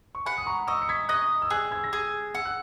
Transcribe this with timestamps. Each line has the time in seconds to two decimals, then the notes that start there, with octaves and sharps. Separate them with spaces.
0.15 C#6
0.26 F#5 G#5 B5
0.37 D#6
0.46 A#5 C#6
0.67 D#5 C#6 E6
0.82 C#7
0.89 G#6 B6
1.09 D#5 F#6 A#6
1.42 E6
1.50 G#4 D#6 F#6
1.71 E6 G#6
1.84 A#6
1.93 G#4 E6 G#6
2.34 F#5 E6
2.45 F#6